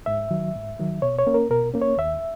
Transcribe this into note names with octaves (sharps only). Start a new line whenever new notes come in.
G#2 E5
D#3 F#3
G#2
D#3 F#3
B2 C#5
C#5
A#3 C#4
A#4
B2 A#4
A#3 C#4
C#5
D#2 E5